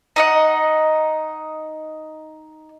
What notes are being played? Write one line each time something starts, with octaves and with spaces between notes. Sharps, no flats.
D#4 D#5 F#5